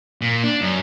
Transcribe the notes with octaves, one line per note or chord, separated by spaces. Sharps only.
A#2
D4
F#2